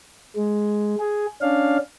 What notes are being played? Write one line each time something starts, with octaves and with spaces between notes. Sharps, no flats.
G#3
G#4
C#4 D4 F5